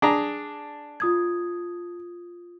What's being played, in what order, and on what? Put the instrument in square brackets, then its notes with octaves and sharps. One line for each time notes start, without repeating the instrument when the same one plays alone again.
[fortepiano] D4 G#4 A#5
[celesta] F4 D#6 G#6